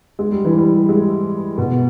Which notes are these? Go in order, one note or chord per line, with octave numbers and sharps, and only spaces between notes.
G#3
G3
E3
G3
G#3
B2